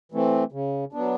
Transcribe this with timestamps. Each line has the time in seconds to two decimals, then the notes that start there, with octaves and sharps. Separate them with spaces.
0.12 E3 A3 C4
0.52 C#3
0.93 F#3 B3 D4